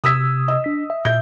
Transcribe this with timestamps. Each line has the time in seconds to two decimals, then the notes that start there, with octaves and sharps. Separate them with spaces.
0.04 C3 D#6 E6 G#6 B6
0.48 D#5 E6
0.64 D4 B6
0.90 E5
1.05 A#2 E5 G6